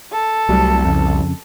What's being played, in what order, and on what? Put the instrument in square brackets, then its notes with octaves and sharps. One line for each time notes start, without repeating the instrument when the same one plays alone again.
[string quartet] A4
[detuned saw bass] C2 [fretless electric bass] F#3 G3 A3
[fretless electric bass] F2 C#3